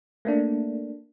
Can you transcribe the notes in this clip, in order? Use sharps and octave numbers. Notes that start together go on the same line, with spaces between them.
A3 A#3 D4